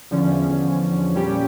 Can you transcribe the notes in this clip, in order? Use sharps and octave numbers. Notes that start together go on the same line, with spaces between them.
E2 D3 F3 C#4
A#2 G3 C#4 G4